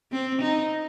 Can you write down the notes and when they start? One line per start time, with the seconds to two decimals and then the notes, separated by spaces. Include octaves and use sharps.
0.12 C4
0.42 D#4